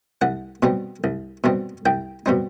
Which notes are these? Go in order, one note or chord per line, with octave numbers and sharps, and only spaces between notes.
C2 F#5
B2 G3 C4 D#4
C2
B2 G3 C4 D#4
C2 G5
B2 G3 C4 D#4